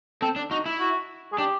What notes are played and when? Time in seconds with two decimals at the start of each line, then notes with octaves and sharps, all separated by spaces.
0.22 C4 A4
0.36 D4
0.51 D#4 F#4
0.66 E4
0.80 F#4
1.32 G#4
1.38 D4 G4